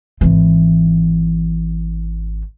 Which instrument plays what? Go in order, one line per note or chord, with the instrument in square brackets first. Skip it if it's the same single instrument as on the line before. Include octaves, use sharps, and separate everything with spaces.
[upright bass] G#1 E3